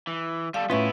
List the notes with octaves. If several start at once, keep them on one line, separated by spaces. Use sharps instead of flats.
E3
G3 A4 F5
A2 B3 C#4 E4 F4 B4 E5 C#6